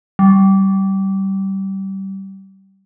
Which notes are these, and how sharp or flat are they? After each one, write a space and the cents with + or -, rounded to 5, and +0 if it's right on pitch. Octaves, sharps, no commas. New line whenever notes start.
G3 -20